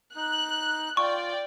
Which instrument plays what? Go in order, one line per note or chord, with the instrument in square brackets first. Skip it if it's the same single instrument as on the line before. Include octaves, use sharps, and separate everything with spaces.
[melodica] D#4 [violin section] F#6
[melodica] F4 [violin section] D5 G5 [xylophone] C#6